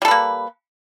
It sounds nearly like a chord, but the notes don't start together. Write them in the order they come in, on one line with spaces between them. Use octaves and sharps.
G3 A4 B4 A#3